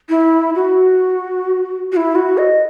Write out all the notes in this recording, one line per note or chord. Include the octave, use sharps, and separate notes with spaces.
E4
F#4
F#4
E4
F#4
D#5